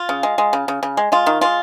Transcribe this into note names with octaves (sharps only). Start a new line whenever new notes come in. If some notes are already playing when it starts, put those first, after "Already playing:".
Already playing: F4
C#3
G#3
G#3
C#3
C#3
C#3
G#3
G#3 F4
D#3
G#3 F4